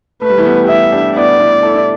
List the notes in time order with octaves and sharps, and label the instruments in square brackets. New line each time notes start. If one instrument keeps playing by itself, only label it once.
[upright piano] A3 [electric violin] B4
[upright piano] G3
E3 A3
G3 B3
G4
[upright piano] B3 E4 [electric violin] E5
[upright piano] D4 G4
[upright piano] B3 E4 [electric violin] D5
[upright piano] B3 E4
E4 A4
E4